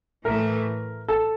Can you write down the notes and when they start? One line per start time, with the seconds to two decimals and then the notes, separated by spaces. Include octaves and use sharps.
0.25 A2 E3 A3 A#4
1.08 A4